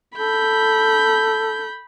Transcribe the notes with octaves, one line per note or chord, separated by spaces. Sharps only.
A4 B5 G6